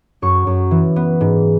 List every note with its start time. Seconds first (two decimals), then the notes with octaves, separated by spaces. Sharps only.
0.22 F#2 C#6
0.47 F#2
0.71 E3
0.96 B3
1.21 G#2